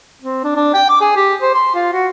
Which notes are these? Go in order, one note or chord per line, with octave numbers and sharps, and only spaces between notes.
C4
D4
D4
G5
D6
G#4
G4
C5
C6
F4
F#4